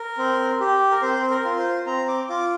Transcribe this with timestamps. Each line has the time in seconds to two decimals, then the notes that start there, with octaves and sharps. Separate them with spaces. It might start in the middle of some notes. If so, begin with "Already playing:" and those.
Already playing: A#4
0.18 C4
0.60 G4
0.91 A#4
1.02 C4 C5
1.30 A#4
1.45 F4
1.58 C5
1.86 C4 A#5
2.08 D6
2.29 F4 D6